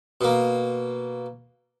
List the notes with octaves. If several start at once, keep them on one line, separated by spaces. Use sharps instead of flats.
B2 A#3